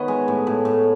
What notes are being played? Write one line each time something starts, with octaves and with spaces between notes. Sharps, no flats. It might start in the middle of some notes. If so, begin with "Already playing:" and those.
Already playing: D#3 B3 B4 C#5 D#5
G#3
A2
A2
A2